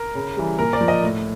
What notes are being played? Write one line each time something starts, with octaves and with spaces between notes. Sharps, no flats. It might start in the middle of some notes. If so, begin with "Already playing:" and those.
Already playing: A#4
C#3
E3 G3
A#2 A#4
D5
F3
D#5
A2